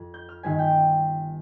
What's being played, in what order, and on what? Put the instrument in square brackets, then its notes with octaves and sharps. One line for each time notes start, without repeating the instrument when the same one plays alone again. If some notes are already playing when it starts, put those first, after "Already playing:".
Already playing: [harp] F2
G6
F6
G1 G2 D#3 G#5
G5